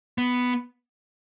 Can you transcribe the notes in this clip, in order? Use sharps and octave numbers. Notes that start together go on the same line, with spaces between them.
B3